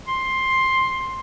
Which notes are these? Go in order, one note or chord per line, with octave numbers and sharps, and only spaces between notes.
C6